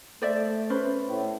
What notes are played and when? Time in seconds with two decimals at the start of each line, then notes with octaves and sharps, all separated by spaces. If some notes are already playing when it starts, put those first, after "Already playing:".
0.22 A3 C5 D5 E5
0.70 C#4 B4 C5
1.09 A2